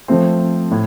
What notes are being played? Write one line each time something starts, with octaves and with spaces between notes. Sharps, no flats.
F3 A3 C4
A2